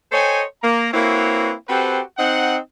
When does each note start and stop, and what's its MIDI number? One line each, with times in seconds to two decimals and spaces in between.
0.12 0.42 69
0.12 0.42 72
0.12 0.42 73
0.12 0.42 75
0.12 0.42 79
0.12 0.42 80
0.62 0.88 58
0.62 0.88 82
0.93 1.52 58
0.93 1.52 60
0.93 1.52 64
0.93 1.52 66
0.93 1.52 71
0.93 1.52 73
1.69 2.01 60
1.69 2.01 66
1.69 2.01 67
1.69 2.01 69
1.69 2.01 71
1.69 2.01 72
2.18 2.57 60
2.18 2.57 63
2.18 2.57 78